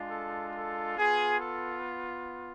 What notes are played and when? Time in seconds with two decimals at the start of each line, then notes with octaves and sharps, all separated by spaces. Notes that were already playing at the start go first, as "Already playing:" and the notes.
Already playing: G#3 D4 F4
0.11 A4
0.54 A4
0.97 B3 F4 G#4
1.40 A4